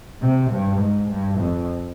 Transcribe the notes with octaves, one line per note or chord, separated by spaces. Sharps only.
C3
G2
G#2
G2
F2